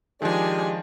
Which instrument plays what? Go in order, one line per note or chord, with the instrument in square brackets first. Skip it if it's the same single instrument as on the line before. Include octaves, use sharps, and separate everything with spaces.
[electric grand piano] D#3 F3 [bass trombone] G#3 [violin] D4 G#5 [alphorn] G4